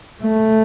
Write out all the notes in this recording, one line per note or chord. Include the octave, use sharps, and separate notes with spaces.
A3